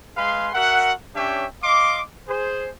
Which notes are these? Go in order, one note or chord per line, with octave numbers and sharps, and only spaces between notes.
G#3 G#4 B4 F5 C6
F#4 A#4 E5 F#5
C#4 D4 G4 C#5 E5 G5
D#5 F5 C6 D6
G#4 C5